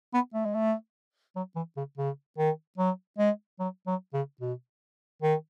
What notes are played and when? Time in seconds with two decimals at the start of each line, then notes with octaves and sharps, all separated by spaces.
0.14 B3
0.34 A3
0.45 G#3
0.54 A3
1.36 F#3
1.56 E3
1.76 C#3
1.97 C#3
2.38 D#3
2.78 F#3
3.18 G#3
3.59 F#3
3.87 F#3
4.13 C#3
4.41 B2
5.22 D#3